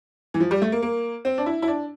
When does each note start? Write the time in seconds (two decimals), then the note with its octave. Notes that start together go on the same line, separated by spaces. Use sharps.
0.34 E3
0.40 F3
0.51 G3
0.62 A3
0.72 A#3
0.82 A#3
1.25 C4
1.38 D4
1.46 E4
1.62 E4
1.68 D4